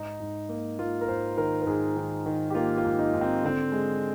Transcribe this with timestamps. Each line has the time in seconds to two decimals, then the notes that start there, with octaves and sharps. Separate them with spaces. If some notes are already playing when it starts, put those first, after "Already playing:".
Already playing: G#2 D#4
0.20 G#2
0.49 A#3
0.79 A#3 F4
1.01 A#4
1.08 G#2 C5
1.38 D#3 A#4
1.62 A#4
1.67 G#2 G#4
1.96 D#3
2.26 D#3
2.50 G4
2.55 A#3 F4
2.77 F4
2.84 G#2
2.99 D#4
3.14 G#2
3.21 C4
3.43 D3 C4
3.72 G#3